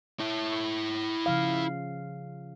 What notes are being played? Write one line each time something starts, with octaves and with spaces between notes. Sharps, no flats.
E4 C#5
C#3 F3 F5